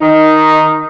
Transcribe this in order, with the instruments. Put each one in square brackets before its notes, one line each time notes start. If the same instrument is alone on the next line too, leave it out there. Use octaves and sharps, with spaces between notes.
[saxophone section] D#3 D#4